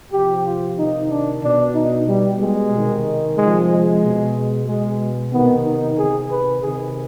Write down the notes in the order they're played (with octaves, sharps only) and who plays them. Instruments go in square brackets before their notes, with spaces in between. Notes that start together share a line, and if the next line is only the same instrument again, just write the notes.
[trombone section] C3 F3 G4
F4
C3 D#3 D#4
D4
B2 D4
D#4
B2 G3
G#3
C3 D#3
C3 F3 G#3
G#3
B2
B2 G#3
C3 D#3 B3
D#4
C3 D#3 G#4
B4
C3 D#3 G#4